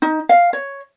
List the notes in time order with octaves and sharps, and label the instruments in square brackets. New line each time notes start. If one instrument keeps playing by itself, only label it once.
[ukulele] D#4
F5
C#5